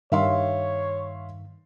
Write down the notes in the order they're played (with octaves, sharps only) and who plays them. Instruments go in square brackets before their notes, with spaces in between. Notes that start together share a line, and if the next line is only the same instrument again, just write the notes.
[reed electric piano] G2 D#3 [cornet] C#5 [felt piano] E5 F5 C6